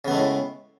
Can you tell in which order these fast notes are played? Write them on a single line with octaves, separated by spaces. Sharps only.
C#3 B3 A3 G#3 A2